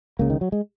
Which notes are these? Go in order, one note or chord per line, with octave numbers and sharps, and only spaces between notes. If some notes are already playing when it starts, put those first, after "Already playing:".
C#2 C#3 A#3
D#3
F#3
G#3